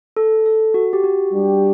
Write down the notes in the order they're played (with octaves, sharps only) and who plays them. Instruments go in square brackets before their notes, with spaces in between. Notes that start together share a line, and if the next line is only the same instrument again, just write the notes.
[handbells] A4
A4
F#4
G4
F#4
[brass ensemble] G3 D4 G4